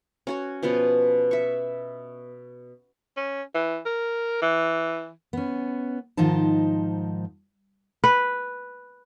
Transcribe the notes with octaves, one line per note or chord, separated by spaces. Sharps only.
C#4 F#4 C#5
B2 F3 B3 C#4
E5 C#6
C#4
E3
A#4
E3
B3 C#4
G#2 D#3 F3 D#4 C5 A5
B4